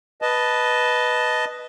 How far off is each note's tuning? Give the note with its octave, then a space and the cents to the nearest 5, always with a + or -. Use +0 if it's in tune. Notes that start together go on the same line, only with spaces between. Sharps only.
B4 +0 D#5 +0 A5 -5